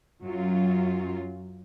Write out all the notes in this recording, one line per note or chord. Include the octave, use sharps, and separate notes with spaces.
F#2 F#3 F4